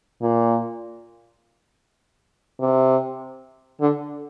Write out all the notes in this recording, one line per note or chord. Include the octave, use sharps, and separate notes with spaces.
A#2
C3
D3